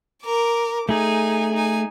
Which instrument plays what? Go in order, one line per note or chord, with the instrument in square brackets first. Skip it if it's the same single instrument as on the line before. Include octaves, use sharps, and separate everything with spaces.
[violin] A#4 D6
[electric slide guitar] A3 G#4 [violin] D#4 G#5
[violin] D#4 G#5